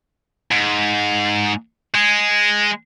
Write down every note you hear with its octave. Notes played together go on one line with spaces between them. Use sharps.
G#2
G#3